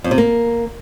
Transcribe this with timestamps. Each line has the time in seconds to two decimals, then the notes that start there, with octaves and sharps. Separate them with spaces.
0.04 F2
0.11 C3
0.18 A#3